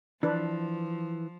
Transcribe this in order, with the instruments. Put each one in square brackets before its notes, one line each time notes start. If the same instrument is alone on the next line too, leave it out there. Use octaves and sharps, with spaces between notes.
[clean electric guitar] E3 [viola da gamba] F3 [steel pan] D4 B4